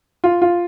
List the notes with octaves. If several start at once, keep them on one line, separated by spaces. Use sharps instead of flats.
F4
F4